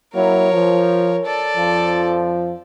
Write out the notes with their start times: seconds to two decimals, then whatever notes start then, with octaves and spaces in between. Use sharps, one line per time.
0.14 F#3 A#3 E4 A#4 C#5
0.52 F3
1.25 A4 D5
1.57 F2 F3